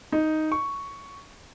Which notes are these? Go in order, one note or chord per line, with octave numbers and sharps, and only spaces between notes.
D#4
C#6